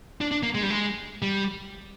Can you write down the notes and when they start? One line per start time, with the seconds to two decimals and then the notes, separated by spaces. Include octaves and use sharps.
0.21 D4
0.31 D4
0.43 A#3
0.55 G#3
0.63 G3
0.70 G#3
1.22 G3